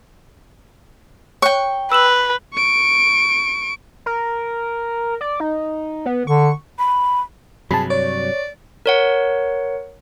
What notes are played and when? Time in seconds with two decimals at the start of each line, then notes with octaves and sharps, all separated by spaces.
1.42 C#5 G5 C#6 F#6
1.92 B4 E6 E7 F#7
2.53 C#6 D7
4.06 A#4
5.21 D5
5.40 D#4
6.06 B3
6.27 D3 C#6
6.79 B5
7.71 G2 C3 F#3 G#4 A5 B5
7.90 C#5 D5
8.86 A#4 C#5 F#5